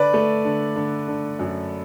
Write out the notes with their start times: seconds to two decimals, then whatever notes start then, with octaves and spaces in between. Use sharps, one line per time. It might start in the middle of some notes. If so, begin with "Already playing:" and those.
Already playing: D3 B4 D5
0.13 A3
0.45 D3
0.76 D3
1.08 D3
1.39 F#2